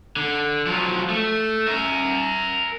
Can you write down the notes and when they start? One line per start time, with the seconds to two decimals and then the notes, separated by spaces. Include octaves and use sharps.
0.16 D3
0.67 F3 F#3
1.09 A3
1.67 A#4 E5